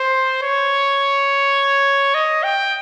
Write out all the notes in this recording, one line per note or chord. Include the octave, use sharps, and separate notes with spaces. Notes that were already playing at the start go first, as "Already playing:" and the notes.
Already playing: C5
C#5
D#5
G5